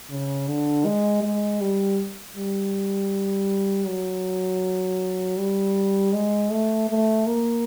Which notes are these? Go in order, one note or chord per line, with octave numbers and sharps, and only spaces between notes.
C#3
D3
G#3
G#3
G3
G3
F#3
G3
G#3
A3
A3
A#3